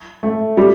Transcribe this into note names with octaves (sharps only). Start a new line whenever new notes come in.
A3
G3